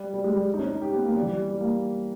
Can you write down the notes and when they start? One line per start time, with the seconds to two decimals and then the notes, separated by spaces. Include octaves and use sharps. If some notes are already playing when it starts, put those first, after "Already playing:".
Already playing: G3
0.14 G3
0.24 G#3
0.35 G3
0.54 D#4
0.59 C#4
0.70 D#4
0.82 G4
0.93 B3
1.04 A#3
1.16 G3
1.22 E3
1.27 G3
1.49 G3
1.61 A#3